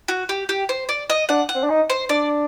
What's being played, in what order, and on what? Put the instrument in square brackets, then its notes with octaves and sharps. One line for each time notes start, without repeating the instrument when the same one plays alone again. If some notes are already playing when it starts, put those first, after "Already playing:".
[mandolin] F#4
G4
G4
C5
D5
D#5
[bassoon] D4 [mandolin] F#5
[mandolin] F#5
[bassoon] C4
D4
D#4
[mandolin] C5
[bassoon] D4 [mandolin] D5